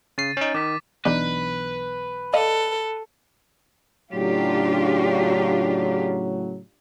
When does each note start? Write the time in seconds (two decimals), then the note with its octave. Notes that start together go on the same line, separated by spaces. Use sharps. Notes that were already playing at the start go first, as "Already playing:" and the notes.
0.18 C#3 A6 C7 D#7
0.37 C#4 D#4
0.54 D#3 D6 B6
1.05 B1 E3 B3 D4 D#4 B4
2.33 A4 D5 D#5 F5
4.11 A2 C#3 F#3 D4 F4 G4